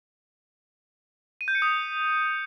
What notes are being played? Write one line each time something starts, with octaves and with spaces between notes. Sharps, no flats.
D#7
G6
C#7
D#6